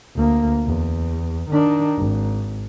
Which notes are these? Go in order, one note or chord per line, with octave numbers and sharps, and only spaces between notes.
D2 A#3
E2
D#3 D4
G#1